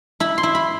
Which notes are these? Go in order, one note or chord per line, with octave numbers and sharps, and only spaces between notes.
E4 B5
C6
E4
B5